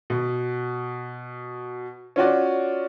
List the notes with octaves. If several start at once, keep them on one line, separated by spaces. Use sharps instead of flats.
B2
C#4 F4 F#4 D5